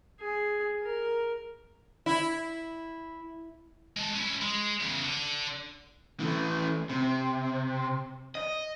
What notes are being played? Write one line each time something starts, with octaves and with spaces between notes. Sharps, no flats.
G#4
A#4
E4
G#3 A5
C#4 E4
G#3
E2 C#3
D3
E3 A3
C3
D#5